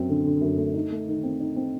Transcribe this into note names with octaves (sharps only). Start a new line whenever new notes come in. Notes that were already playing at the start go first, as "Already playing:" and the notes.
Already playing: F#2 C4
D3
D3
F#2
A3
D#4
A3
D#3
C4
D#4
C4